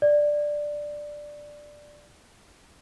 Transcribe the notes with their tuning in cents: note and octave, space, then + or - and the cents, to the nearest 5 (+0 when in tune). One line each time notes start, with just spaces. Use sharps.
D5 +5